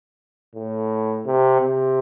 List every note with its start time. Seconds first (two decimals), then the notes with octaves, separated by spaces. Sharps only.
0.55 A2
1.26 C3
1.60 C3